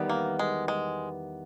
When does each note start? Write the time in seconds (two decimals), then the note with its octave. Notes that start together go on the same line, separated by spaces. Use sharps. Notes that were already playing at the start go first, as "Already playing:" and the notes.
Already playing: E2 D#3 G3 B3
0.09 A#3
0.39 G#3
0.68 G#3